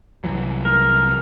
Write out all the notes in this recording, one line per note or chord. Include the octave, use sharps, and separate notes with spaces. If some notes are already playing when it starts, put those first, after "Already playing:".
C2 E3 F#3
A#4